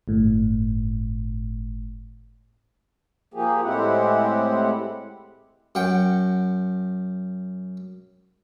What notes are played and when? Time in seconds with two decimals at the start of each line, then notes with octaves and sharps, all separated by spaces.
0.08 G1 A2
3.34 F3 A#3 G4 G#4
3.64 A2 G#3 C4 E4 G4 F#5
5.75 F#2 F#5 G5